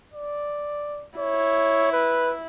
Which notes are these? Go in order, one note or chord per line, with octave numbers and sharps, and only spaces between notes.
D5
E4 C#5
B4